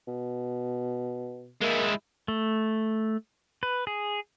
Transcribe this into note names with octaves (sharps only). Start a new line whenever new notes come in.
B2
G#3 A#3 E4
A3
B4
G#4